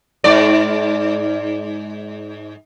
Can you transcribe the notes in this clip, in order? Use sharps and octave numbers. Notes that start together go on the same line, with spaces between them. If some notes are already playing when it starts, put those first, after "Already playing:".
G#2 D5